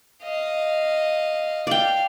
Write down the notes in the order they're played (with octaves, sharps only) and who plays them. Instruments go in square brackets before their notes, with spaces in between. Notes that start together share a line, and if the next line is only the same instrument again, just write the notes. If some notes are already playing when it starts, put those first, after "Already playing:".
[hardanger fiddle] D#5 F5
[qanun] D5 G5 [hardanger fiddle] F5